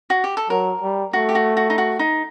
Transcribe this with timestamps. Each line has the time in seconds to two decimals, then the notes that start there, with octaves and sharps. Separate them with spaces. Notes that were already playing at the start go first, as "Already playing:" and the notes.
0.10 F#4
0.24 G4
0.37 A4
0.50 F#3 A#4
0.82 G3
1.13 A3 F#4
1.29 G4
1.35 F#4
1.57 F#4
1.70 D#4
1.78 F#4
1.99 D#4